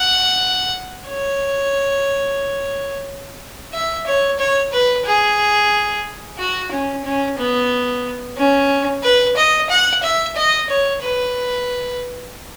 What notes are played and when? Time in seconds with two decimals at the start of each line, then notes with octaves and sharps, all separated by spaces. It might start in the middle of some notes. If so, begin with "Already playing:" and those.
Already playing: F#5
1.08 C#5
3.73 E5
4.06 C#5
4.39 C#5
4.72 B4
5.05 G#4
6.38 F#4
6.71 C#4
7.05 C#4
7.38 B3
8.37 C#4
9.03 B4
9.36 D#5
9.70 F#5
10.03 E5
10.36 D#5
10.69 C#5
11.02 B4